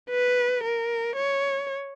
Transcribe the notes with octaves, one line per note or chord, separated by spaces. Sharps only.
B4
A#4
C#5